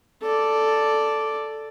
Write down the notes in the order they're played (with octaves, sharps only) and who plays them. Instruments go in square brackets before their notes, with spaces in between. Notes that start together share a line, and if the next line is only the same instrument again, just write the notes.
[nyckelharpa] A4 D5